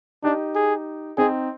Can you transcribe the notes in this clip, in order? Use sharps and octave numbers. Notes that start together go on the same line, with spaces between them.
D4 D#4 G4
G#4
C4 D#4 G#4